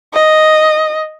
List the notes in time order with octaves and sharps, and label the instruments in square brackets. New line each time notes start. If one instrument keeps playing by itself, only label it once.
[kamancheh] D#5